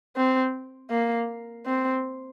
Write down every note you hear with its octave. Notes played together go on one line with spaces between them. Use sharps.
C4
A#3
C4